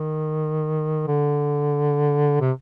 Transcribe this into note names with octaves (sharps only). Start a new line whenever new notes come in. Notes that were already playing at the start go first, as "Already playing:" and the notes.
Already playing: D#3
D3
C3